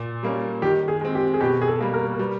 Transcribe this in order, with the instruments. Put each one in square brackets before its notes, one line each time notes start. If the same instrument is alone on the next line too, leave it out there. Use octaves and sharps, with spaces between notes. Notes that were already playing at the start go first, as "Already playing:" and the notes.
Already playing: [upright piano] A#2
G3 A#3 C#4
[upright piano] D#3 [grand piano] G4
[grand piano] G#4
[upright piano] G#3 C4
[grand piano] G4
G#4
[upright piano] B2 [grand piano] G4
[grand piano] G#4
A4
[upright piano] G3 A#3
[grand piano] A#4
A#4
[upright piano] G3 [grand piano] B4